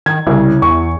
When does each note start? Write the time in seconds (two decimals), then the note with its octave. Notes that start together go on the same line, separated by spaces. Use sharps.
0.06 D#3 G#6
0.27 C2 C#3 E4
0.62 E2 C#6